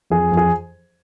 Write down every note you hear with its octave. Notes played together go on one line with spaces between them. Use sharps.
F2 G#4
F2
G#4